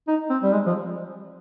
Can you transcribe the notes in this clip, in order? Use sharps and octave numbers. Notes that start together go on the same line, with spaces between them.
D#4
C4
G3
G#3
F3